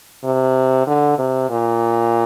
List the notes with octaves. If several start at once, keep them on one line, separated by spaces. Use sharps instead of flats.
C3
D3
C3
A#2